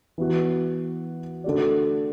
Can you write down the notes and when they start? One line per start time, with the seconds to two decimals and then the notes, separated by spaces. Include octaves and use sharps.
0.18 E3 B3 F#4
1.44 D3 A3 F#4 D5